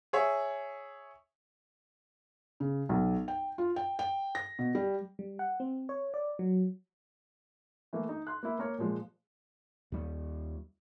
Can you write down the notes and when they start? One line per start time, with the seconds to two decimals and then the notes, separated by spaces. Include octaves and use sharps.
0.13 G#4 C#5 E5
2.60 C#3
2.89 B1
3.28 G5
3.58 F4
3.76 G5
3.99 G5
4.35 A#6
4.59 B2
4.75 G3
5.19 G3
5.39 F#5
5.60 C4
5.89 C#5
6.14 D5
6.39 F#3
7.93 E3 A3 A#3
8.09 D#4
8.27 C6 F#6
8.43 A#3 E4
8.59 A#3 A#4 C#5
8.78 A#2 F3 G#3
9.92 D#2 G3